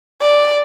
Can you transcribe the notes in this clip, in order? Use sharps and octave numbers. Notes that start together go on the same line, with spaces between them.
D5